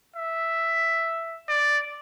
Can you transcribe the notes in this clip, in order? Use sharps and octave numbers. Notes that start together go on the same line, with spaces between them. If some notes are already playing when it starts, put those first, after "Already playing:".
E5
D5